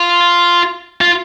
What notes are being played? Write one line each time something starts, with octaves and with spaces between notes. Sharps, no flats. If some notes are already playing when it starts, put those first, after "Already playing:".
Already playing: F4
F4